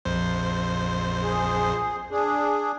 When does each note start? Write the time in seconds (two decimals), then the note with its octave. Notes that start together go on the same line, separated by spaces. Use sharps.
0.05 A#1 F2 C5
1.23 G#4
2.11 D4 G#4